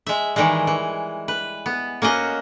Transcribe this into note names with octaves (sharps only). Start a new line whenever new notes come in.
G#3 E5
D#3 E3 G3 G#3
E3
B4
B3
A#3 C#4 F#4 D#5